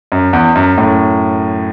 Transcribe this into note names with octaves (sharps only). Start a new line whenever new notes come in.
F#2
E2
F#2
F#2 A2